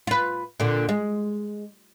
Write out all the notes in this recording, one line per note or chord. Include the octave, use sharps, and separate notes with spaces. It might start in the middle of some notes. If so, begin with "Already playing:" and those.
F4 B4
A#2 D3
G#3